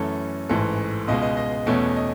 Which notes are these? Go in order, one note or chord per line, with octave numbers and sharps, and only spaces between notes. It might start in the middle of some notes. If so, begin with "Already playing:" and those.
Already playing: F#2 E3 A3 C#4 A4
A1 G#2 E3 A3 A4
C#2 B2 G#3 D#5
D#5
D#5
E2 B2 A3 C#4
D#5